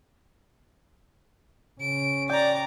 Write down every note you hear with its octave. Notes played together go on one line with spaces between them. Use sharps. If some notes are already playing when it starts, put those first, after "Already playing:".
C#3 C#4 D7
D5 G5 A#5 D6